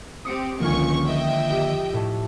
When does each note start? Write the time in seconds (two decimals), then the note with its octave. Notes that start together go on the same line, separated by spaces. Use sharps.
0.25 C4 G4 D#6 C#7 D7
0.60 C#2 D3 D#3 F3 A#3 F4 G#5 C#6
1.05 D#5 E5 G5
1.50 G4
1.93 A2 A3